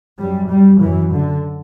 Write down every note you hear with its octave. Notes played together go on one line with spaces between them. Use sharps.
F#2 G3
G3
F#2 E3
D3